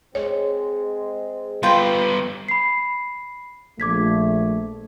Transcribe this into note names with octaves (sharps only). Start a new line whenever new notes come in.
G#3 C4 C#5
G3 B3 F4 B4 G5
B5 C7
A#1 A3 D6 G#6 B6